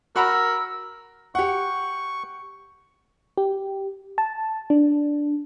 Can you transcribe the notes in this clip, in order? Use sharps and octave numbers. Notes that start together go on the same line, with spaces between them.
F#4 A#4 F#5 B5 E6
G4 F#5 C#6
G4
A5
D4